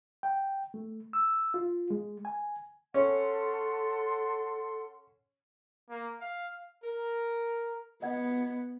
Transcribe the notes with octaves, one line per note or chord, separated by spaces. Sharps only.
G5
A3
E6
F4
G#3
G#5
C#4 A4 F#5 C6
A#3
F5
A#4
B3 D#5 F#5 G#6